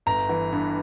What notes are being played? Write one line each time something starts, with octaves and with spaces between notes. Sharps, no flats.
G1 A#5
E3
G2